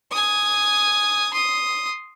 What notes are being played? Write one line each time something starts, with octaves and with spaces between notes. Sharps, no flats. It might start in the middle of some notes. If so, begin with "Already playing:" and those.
G#5 D#6
C6 D#6